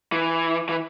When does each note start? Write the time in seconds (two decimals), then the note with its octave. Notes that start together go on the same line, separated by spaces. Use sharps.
0.12 E3
0.69 E3